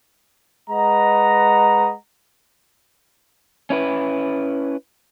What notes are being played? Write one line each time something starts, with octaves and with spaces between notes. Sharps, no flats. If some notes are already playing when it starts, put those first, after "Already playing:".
G#3 B4 D#5 F#5 A#5
C#4 E4 B4